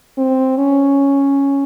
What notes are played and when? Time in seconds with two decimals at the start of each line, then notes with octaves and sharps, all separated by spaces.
0.17 C4
0.57 C#4